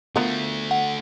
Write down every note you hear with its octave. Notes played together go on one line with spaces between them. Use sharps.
D3 F3 A3 B3 A#4
F#5